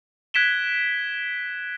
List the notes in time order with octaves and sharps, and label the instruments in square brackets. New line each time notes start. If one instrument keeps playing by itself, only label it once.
[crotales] F#6 G#6 B6 D7 E7 G7